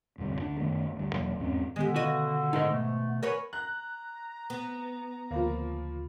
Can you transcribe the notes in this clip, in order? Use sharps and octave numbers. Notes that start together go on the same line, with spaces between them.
F1 D2 G2 C3
D2 D4
F#2 D#3 A3 B3
D2 G2
E1 E3 F#3 A#3
E2 G#2 C4 C#4
B2 D3 D#3 G#3 B3 G4
C#3 F#4 D#5
G#2 D#4 A#4 D#5
B2 A3
A#4 B4 C#5 F#5 G#5 C#6
A#5 F#6
B3
D2 C#3 F3 A#3 B5